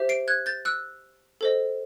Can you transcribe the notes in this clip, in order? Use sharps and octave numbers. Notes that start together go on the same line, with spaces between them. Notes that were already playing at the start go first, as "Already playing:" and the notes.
Already playing: G4 C5 E5
C7 D7
F#6 G#6
G6 A6
E6 F#6
A4 C5 D#5